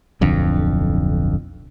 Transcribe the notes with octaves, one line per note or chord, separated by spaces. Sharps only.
D1 B1 F2 D3